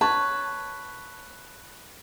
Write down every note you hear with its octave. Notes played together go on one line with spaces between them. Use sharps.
B4 C#5 A5